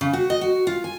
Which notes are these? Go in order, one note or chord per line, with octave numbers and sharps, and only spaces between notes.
C#3
F#4
D#5
F#4
F4
G#5